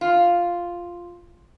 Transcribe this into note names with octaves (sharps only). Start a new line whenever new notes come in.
F4